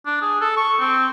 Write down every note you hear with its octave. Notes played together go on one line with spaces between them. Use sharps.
D4
G#4
A4
C#6
C4